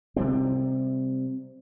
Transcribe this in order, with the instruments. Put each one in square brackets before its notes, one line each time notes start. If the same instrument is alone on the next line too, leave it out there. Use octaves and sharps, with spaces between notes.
[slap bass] C3 G3 C4